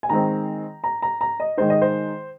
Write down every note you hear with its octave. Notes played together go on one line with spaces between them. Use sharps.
G#5
D#3 G#3 C4 A#5
A#5
A#5
A#5
D#5
D#3 G#3 D#4 C5
D#5
C5